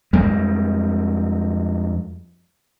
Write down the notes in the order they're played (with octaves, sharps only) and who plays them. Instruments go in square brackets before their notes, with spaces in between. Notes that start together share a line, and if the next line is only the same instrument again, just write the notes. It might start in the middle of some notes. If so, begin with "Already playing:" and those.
[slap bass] F2 G3 G#3